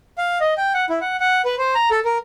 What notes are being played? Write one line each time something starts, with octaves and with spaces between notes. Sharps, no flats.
F5
D#5
G5
F#5
E4
F#5
F#5
B4
C5
A#5
A4
A#4